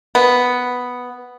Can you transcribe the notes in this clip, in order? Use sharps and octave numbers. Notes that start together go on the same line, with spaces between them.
B3